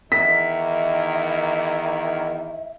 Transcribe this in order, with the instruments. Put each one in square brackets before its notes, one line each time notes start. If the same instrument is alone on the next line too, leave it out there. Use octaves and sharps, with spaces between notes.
[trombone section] E2 D#3 [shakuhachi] E5 [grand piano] B6